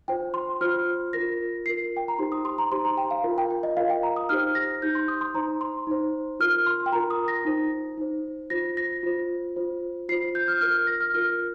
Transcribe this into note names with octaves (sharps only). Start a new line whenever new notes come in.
F4 C5 G5
C6
F4 C5 F6
F4 A#4 A#6
F4 A#4 C7
G5
A#5
D#4 G4 C5 C6
D#6
C6
A#5
D#4 G4 C5 C6
A#5
G5
F5
F4 A#4
G5
G5
D#5
F4 A#4 F5
G5
A#5
D#6
D#4 G4 C5 F6
A#6
D#4 G4 C5 G6
C6
D#6
C6
D#4 C5 A#5
C6
D#4 C5
F4 A#4 F6
C6
G5
F4 A#4 A#5
D#6
A#6
D#4 C5
D#4 C5
F4 C5 A#6
A#6
F4 C5
F4 C5
F4 C5 C7
G6
F6
F4 A#4 F6
F6
A#6
F6
F4 A#4 F6